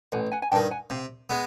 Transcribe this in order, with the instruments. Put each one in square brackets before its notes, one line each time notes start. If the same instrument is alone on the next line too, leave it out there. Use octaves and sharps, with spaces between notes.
[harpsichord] A1 [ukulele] F#5 G#5
[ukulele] F#5 G#5
G#5
[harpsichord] G2 [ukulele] G5 A5
[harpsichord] D#3
[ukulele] F#5 G#5
[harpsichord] C3 [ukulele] F5 G5
[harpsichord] G#3 B3